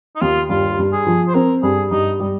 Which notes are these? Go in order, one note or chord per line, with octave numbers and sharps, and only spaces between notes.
D#4
D#2 F4
G2 F4
G2
G#4
F3
C5
C4 A#4
G2 G#4
G2 D#4
G3